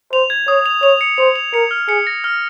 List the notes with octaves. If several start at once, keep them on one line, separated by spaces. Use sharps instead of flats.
C5 F7
G#6
C#5 D#6
F7
C#5 F7
C#7
C5 F7
F7
A#4 C#7
F6
G#4 C#7
A#6
F6